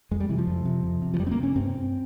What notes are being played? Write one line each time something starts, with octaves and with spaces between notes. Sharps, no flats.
F2 G#3
G3
C3 E3
F3
F2
C3
F2
C3
F3
F2 G3
C4
A#3
C3
C#4
G2 C4